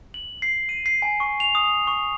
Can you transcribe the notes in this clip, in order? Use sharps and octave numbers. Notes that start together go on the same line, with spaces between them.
F#7
C7
D#7
C7
G#5
C#6
F7
D#6
C#6